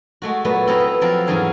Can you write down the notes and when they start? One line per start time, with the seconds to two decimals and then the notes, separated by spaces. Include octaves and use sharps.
0.22 G#3 A3 F#4
0.45 A#2 F#3 A3 B3 F#4
0.67 C4 E4 A4 D#5 F5 A#5
0.80 B3
1.01 F3 F#3 C4 A4 A#4 F5
1.27 E2 G#2 F#3 C#4 G#4 A#4